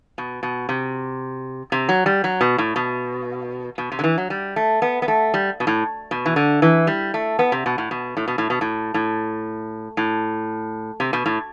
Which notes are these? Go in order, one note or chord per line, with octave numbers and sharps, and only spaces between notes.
B2
B2
C3
C3
F#3
G3
F#3
B2
A2
B2
B2
C3
D3
E3
F#3
G3
A3
B3
B3
A3
G3
B2
A2
B2
E3
D3
E3
G3
A3
B3
C3
B2
A2
B2
A2
B2
A2
B2
A2
A2
A2
C3
B2
A2